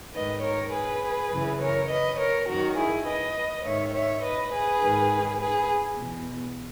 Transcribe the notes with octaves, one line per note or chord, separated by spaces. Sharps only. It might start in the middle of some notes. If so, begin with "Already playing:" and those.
G#2 D#3 B4 D#5
A#4 C#5
G#4 B4
F#2 C#3 E3
A#4 C#5
B4 D#5
A#4 C#5
F#2 D#3 F#4 A#4
E4 G#4
B4 D#5
G#2 D#3 C#5 E5
C#5 E5
B4 D#5
G#4 B4
G#2 D#3
G#4 B4
E2 B2